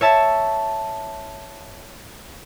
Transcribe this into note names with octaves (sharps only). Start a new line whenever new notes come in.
C#5 E5 A5